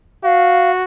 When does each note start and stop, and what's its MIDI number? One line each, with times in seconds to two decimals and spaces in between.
0.24 0.84 66
0.24 0.71 77